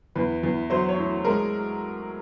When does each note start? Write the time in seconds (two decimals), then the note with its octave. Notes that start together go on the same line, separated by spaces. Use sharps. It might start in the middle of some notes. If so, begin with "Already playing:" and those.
0.15 E2 B4
0.43 E2
0.70 F#3 C5
0.89 C#5
0.97 A2
1.24 G#3 A#4